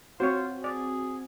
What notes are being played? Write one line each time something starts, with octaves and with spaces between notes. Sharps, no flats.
C4 F4 F#4 C5 C#5
G#4 D5